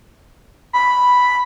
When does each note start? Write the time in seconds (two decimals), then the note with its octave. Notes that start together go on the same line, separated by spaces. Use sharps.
0.73 B5